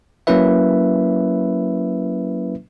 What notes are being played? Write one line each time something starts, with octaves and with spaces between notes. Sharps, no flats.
F#3 A#3 C#4 E4 B4 E5